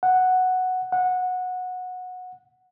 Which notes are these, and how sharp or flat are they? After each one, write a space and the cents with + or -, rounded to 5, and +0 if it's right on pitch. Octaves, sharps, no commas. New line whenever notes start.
F#5 +0
F#5 -15